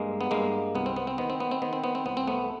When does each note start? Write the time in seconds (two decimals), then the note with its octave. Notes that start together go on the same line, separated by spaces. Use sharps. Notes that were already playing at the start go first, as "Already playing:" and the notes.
Already playing: G2 G#3 A#3
0.21 B3
0.31 G2 G#3 A#3
0.75 C2 B3
0.86 C4
0.96 B3
1.07 C4
1.18 D#3 B3
1.30 C4
1.40 B3
1.51 C4
1.62 D#3 B3
1.73 C4
1.84 B3
1.95 C4
2.05 C2 B3
2.17 C4
2.27 A3 B3